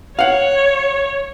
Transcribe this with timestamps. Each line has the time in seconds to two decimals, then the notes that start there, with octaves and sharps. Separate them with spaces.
0.19 C#5 F5 F#5